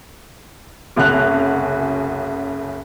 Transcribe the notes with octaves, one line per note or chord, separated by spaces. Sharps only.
F#1 C2 C#3 F#4 F#6 F7